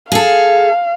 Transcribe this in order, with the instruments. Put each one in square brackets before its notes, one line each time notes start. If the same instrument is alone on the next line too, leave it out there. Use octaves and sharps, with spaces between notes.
[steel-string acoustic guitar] G#4 A4 [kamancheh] F5